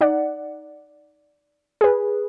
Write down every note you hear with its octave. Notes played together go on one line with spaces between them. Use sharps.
D#4 D5 F#5
G#4 B4